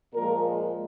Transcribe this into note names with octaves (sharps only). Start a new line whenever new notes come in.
A#2 F3 G#3 A#4